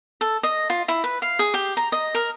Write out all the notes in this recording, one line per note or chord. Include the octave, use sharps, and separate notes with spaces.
A4
D#5
F4
E4
B4
F5
G#4
G4
A#5
D#5
A#4